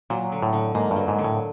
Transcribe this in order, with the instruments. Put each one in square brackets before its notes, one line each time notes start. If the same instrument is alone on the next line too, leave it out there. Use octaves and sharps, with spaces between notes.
[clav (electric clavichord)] A#2 [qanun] F#3
[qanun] D3
[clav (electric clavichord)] A2
[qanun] D3
[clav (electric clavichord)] G#2 [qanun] A#3
[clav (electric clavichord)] G2
[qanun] F#3
[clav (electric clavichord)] G#2
[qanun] D3
[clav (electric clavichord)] A2